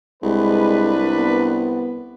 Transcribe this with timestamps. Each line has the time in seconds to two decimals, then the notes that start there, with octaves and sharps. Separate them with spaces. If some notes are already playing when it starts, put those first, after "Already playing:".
0.23 C2 G#3 D4 A#4 B4
1.14 B3